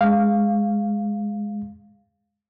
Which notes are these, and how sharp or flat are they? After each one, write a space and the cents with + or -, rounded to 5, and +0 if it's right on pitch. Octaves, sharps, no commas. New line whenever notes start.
G#3 +0 F5 +0